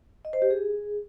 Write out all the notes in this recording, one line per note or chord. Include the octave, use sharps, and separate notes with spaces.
D#5
C5
G4
G#4